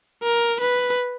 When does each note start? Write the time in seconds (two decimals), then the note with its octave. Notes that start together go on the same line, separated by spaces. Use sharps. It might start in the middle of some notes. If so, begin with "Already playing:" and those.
0.23 A#4
0.61 B4